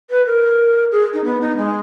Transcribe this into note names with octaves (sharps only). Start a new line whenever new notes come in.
B4
A#4
G#4
D#4
B3
D#4
G#3